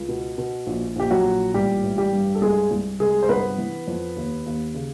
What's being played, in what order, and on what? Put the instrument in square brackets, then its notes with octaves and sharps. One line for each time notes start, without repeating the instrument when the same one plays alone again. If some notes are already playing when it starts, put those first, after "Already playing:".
Already playing: [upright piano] C#2
B2
B2
A#1
A#1 G4
F#3 F#4
A#2
A1 G3 G4
A1
G3 G4
G2
A4
C2 G#3 G#4
C2
C3 G#3 G#4
C5
G1 B3 B4
E3
F2
D#2
D#2
C#3